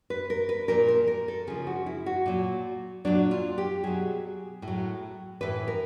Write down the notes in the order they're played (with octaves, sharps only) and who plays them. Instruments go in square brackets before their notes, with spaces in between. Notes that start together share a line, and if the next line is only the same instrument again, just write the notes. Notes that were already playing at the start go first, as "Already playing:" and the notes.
[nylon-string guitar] B4
A#4
B4
A#2 F3 A#4
A#4
A#4
A4
C#3 F3 G#4
F#4
E4
F#4
A#2 F#3
A#2 F#3 D4
F4
G4
B2 F#3 G#4
A2
F#3
A2 E3 B4
A#4